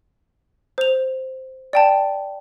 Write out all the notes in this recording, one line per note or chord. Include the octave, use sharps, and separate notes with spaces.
C5 F7
D5 G5 A5